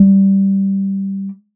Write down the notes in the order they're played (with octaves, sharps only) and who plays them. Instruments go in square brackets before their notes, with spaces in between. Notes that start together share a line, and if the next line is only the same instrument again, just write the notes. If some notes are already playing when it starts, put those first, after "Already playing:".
Already playing: [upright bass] G3